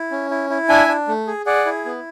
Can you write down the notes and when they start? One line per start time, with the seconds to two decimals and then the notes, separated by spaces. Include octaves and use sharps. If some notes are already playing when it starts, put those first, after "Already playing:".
Already playing: E4
0.11 C#4
0.30 E4
0.50 E4
0.69 D4 E5 G#5
0.88 D4
1.08 A3
1.27 G#4
1.46 G#4 D5 F#5
1.66 E4
1.85 B3